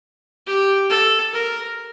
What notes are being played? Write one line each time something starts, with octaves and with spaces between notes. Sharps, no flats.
G4
A4
A#4